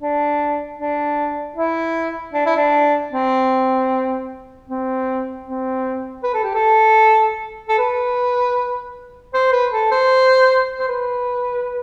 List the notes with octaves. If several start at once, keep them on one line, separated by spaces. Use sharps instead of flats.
D4
D4
E4
D4
E4
D4
C4
C4
C4
B4
A4
G4
A4
A4
B4
C5
B4
A4
C5
C5
B4